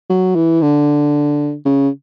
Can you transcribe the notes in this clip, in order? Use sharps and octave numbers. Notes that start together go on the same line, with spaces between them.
F#3
E3
D3
C#3